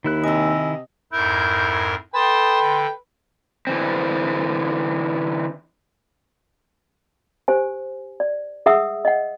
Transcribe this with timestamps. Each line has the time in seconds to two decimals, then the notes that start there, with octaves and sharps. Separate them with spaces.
0.04 D#2 D#3 E4 F#6
0.24 C3 D#5 G#5 E6
1.13 F2 G#2 E4 A#4 G6
2.14 A4 B4 G5 A5 C6 D#6 A6
2.60 D3
3.67 D3 E3 C4
7.48 G4 C5 G#5
8.20 D5
8.66 G#4 E5 F#5 D#6 E6
9.05 D#5 F#5